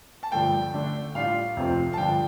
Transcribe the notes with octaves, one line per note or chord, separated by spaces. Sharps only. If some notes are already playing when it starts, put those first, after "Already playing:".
A5
G2 D3 F3 A3 G5
D3 A3 D4
A2 G3 D4 F4 F5
F2 C3 F3 A3 C4
A5
G2 D3 F3 G5